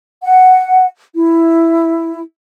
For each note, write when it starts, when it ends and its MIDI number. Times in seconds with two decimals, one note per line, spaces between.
0.23 0.86 78
1.15 2.21 64